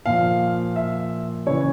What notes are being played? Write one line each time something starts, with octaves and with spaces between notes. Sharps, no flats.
A#2 F3 F5
E5
C#3 E3 C#5